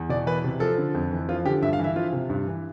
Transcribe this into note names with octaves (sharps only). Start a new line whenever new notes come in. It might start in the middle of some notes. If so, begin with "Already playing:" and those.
Already playing: E2
B2 D5
E3 B4
C3
F3 A4
D3
F2
E3
F3 F4
D3 G4
G2 E5
F5
E3 E5
F3 F4
C3
G2
E3